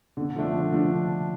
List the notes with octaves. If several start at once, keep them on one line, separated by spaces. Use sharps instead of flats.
D3
F3 A3 D4
D3
F3 A3 D4